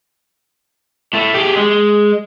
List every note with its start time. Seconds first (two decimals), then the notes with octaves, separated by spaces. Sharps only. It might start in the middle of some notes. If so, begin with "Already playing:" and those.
1.13 A2 A3
1.34 G4 G#4
1.56 G#3